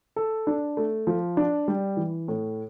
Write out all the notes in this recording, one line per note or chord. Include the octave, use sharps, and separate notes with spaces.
A4
D4
A3
F3
D4
G3
E3
A2